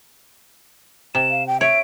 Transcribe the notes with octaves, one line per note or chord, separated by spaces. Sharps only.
C3 E7
F5
G5
C#5 E5 D7